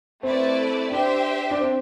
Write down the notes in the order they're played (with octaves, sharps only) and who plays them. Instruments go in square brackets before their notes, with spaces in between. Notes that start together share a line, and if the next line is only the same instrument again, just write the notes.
[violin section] A3 E4 B4 D5 [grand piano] C4
[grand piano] D4 [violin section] G4 C5 E5 G5
[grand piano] D4
C4